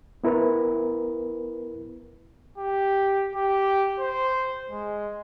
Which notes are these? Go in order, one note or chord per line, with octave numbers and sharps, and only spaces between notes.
B3 E4 A#4 B4
G4
G4
C5
G#3